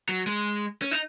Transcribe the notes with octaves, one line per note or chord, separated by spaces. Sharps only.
F#3
G#3
C#4
D#4